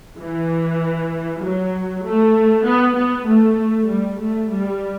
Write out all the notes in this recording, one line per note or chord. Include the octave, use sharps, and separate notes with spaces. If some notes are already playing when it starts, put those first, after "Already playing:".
E3
F#3
A3
B3
B3
A3
G3
A3
G3